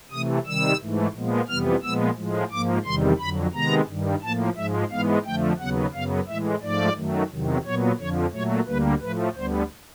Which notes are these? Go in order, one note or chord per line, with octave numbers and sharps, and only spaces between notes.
C3 E3 A3 D#6
C3 D#3 G3 E6
G#2 E3 A3
A#2 F3 G#3 B3
F2 C3 E3 G3 B3 F6
A#2 F3 G#3 B3 E6
A2 F3 G#3
G#2 F3 A#3 D6
E2 C3 D#3 G3 C6
F2 D3 F#3 B5
C3 D#3 G#3 B3 A#5
G2 D#3 G3
A2 F3 A#3 A5
G#2 F3 G#3 E5
G#2 E3 G#3 B3 F5
F2 D3 F3 A3 G5
D#2 C#3 F#3 B3 F#5
F#2 C#3 F#3 B3 F5
A2 E3 G#3 E5
G#2 F3 A3 D5
F#2 D#3 F#3 A3
E2 C3 D#3 F#3
A#2 F#3 B3 C#5
F2 D3 F3 C#5
A#2 F#3 A3 C#5
D2 D3 G3 A#3 B4
A2 F3 A3 B4
D2 D3 G3 B3 C5